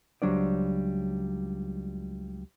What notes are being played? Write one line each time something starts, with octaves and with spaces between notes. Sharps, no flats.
C#2 F#3 G3 D4 C5 D5